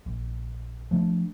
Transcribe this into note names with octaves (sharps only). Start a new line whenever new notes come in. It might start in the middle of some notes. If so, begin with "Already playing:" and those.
A#1
F3 A3 C4 D4